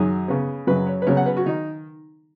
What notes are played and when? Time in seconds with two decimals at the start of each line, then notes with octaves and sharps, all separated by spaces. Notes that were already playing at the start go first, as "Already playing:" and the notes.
Already playing: F#2 D#3 F#3 G#4
0.28 C#3 B3
0.67 F#2 C#3 F#3 B4
0.87 C#5
1.02 B4
1.07 C#3 F#3 B3 C#5
1.17 F#5
1.26 B4
1.37 F#4
1.46 D#3 D#4